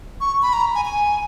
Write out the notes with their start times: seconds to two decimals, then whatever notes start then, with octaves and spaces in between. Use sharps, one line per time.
0.21 C#6
0.42 B5
0.53 A#5
0.75 G#5
0.85 G#5